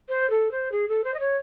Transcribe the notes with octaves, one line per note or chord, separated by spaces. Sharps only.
C5
A4
C5
G#4
A4
C5
D#5
C#5